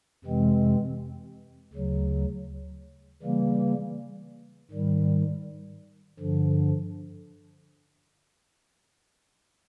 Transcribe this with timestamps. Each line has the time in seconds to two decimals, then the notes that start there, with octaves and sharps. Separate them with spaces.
0.24 F2 C3 E3 G#3 C4
1.73 D2 C#3 F#3
3.23 C#3 E3 G3 A#3
4.71 G#2 D#3 G3
6.20 G2 D3 F3